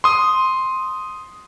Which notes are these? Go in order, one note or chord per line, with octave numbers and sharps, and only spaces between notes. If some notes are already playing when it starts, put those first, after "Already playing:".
C6 D#6